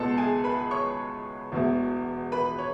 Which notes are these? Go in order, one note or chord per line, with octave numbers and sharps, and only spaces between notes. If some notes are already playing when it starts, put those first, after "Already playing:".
Already playing: C#2 B2 G#3 B3 A4 A5
G#4 G#5
B4 B5
C#5 C#6
E1 E2 B2 A3
B4 B5
C#5